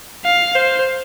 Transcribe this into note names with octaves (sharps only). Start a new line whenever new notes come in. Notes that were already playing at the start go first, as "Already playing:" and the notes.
F5
C5